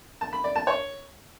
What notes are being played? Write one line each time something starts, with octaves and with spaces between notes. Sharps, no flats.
A5
B5
D5
A5
C#5